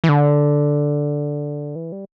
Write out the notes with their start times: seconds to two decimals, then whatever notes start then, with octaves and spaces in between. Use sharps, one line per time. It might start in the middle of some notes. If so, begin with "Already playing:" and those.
0.04 E3
0.09 D3
1.76 E3
1.92 G3